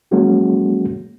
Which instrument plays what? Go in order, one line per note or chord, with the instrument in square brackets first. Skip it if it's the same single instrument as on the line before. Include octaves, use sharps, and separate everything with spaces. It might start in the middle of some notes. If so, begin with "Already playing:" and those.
[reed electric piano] F3 F#3 G#3 A#3 C#4 F#4